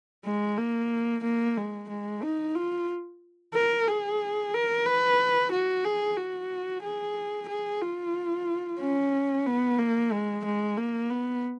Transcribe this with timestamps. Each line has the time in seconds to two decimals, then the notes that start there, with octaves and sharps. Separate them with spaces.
0.25 G#3
0.58 A#3
1.23 A#3
1.57 G#3
1.89 G#3
2.23 D#4
2.55 F4
3.54 A#4
3.87 G#4
4.53 A#4
4.86 B4
5.51 F#4
5.84 G#4
6.17 F#4
6.83 G#4
7.48 G#4
7.82 F4
8.80 C#4
9.47 B3
9.79 A#3
10.12 G#3
10.45 G#3
10.78 A#3
11.10 B3